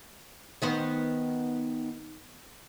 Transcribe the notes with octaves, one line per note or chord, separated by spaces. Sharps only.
D#3 B3 C5